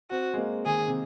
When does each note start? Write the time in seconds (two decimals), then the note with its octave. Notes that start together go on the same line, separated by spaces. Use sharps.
0.11 C4 F#4
0.34 G#3
0.38 A#3
0.66 D#3 G#4
0.88 C3